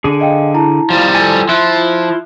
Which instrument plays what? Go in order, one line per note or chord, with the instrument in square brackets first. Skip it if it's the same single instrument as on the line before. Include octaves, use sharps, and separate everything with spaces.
[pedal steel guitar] D3 G#4
[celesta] D#5 F5 G5
E4 A5 A#5
[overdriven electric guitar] F3 G3 [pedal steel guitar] F4
[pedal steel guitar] A4 G#5
[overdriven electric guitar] F3 [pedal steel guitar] E4 C6 [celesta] E5 F#6